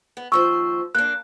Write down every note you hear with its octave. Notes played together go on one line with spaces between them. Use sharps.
B3
D#2 F3 C5 C#6 E6
A#3 D4 F#6